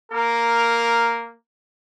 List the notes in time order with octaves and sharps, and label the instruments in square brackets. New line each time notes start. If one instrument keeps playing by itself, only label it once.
[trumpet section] A#3 A#4